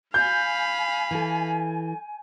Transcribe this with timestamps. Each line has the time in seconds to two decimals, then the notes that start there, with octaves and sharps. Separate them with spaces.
0.14 F5 G#5 B5 G6
1.11 E3 A4